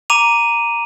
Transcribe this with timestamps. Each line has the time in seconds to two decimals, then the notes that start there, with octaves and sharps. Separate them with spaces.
0.10 A#5 D6 D#7 F7